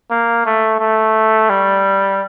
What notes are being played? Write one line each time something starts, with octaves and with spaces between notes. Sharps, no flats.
A#3
A3
A3
G3